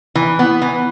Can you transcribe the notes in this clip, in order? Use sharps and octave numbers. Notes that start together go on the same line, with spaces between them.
E3
B3
E3